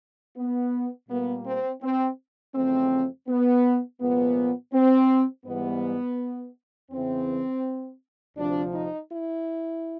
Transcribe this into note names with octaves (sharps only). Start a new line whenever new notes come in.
B3
A#2 G3 A#3 B3
C4
C4
E2 C#3 F3 A3 C4
B3
C2 A#2 F3 G#3 B3
C4
G#2 E3 G3 B3
E2 C#3 E3 C4
D2 C3 F3 D4
D#4
E4